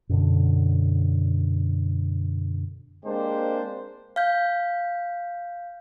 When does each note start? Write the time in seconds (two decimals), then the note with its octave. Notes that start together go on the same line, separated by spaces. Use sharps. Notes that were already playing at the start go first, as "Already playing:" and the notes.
0.09 F#2 B2 D3
3.05 G#3 A#3 C4 D4 G4 C5
4.16 F5 G6